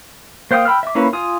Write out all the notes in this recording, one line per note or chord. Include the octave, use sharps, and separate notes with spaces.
A#3 C5 F5 G5 D#6
G5 B5 E6 F6
E5 D6
A#3 C#4 E4 B4
F4 G#5 D#6